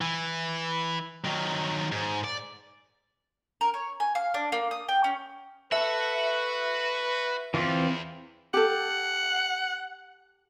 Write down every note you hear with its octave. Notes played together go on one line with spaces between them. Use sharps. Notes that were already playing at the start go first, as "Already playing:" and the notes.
E3
D#3 F#3
G#2
D5
A#4
C#5
G#5
F5
D4
A#3
D#6
G5
C#4
F#4 A4 B4 E5
E2 E3 C4 F4
G4 A4 F#5